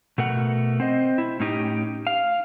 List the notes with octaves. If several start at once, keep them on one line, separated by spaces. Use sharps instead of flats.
B2 A3 A#4 F#5
C4 C5 D#5
E4
A2 C#4 D#4 G4
F5